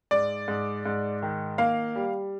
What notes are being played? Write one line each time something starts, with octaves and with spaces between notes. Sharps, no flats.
G#2 D5
G#2
G#2
D#3
A#3 F5
G3